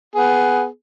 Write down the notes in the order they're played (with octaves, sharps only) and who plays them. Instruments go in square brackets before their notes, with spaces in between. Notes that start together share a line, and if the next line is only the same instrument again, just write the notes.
[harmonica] B3 G#4